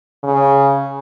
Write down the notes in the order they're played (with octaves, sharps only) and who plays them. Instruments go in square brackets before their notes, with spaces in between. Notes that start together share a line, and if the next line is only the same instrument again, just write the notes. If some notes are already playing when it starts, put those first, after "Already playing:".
[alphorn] C#3